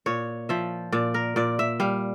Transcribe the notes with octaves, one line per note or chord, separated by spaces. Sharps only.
A#2 C#5
F3 E5
A#2 D5
A#4
A#2 D5
E5
G3 F5